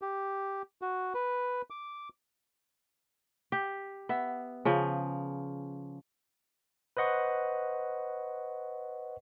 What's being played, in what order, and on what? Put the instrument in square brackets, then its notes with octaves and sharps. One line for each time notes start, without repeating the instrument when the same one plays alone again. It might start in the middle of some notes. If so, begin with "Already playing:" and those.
[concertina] G4
F#4
B4
D6
[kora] G4
B3 E5
C#3 F3 G#4
[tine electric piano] B4 C5 D#5 F#5 C#6